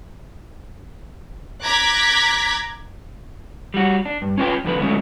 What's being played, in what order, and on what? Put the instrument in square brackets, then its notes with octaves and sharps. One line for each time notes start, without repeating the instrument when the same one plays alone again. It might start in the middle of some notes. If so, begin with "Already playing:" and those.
[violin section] A#5 D6 F#6 G#6 B6
[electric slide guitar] G3 F#4
D4
G2
C#4 F4 B4 G5
F2 D3 B4
D3 F#3 G#3 A3 C4 C#4